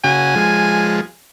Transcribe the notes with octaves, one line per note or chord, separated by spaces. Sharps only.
C#3 F#4 G#5
F3 G#3